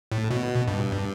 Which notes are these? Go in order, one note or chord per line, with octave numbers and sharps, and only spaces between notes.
A2
B2
G2